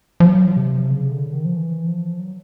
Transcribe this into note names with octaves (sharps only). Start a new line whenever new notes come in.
F3
F#3
C3
C#3
D3
D#3
F3
E3
F3
F#3